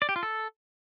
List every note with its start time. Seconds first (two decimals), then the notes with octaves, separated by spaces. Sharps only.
0.02 D5
0.09 G4
0.16 F4
0.23 A4